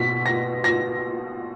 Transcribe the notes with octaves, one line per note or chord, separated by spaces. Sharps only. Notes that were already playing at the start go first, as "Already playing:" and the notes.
Already playing: B2 B6
A#6
A#6